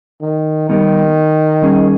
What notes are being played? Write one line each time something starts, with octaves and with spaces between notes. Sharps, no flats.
D#3
D#3 G3 B3 D#4 G4
G3 C#4 G#4